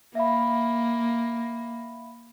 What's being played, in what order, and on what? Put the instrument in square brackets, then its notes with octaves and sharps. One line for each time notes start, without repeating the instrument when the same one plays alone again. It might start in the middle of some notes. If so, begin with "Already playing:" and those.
[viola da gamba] A#3 [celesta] E5 F5 B5